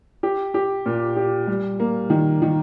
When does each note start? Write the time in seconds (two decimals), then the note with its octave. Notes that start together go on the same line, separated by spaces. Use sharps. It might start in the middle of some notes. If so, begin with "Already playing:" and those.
0.23 G4
0.54 G4
0.86 A#2
1.17 G4
1.47 G3
1.80 A#3
2.10 D#3
2.42 D#3